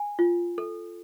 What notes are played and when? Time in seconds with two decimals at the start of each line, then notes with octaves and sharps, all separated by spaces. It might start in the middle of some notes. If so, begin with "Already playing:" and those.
Already playing: G#5
0.19 F4
0.58 A4